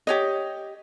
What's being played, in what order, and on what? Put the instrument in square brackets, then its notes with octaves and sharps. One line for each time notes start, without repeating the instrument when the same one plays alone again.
[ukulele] G4 C#5 D#5